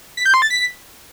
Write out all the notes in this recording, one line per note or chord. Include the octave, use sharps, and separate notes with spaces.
B6
G6
C6
A6
B6